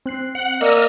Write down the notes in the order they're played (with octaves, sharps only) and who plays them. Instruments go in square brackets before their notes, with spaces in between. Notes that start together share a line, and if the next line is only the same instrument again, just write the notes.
[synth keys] C4 F#6 C7
[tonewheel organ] F#5
[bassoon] A#3 [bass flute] D5 [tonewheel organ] D#5 E6 F6